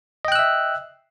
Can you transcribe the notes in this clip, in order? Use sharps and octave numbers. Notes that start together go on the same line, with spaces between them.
D#5 E5 G5 E6 F#6